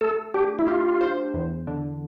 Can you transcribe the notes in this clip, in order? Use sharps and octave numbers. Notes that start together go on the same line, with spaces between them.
A3 A4
D4 G4
E4
F4 G4
C5
E2
D3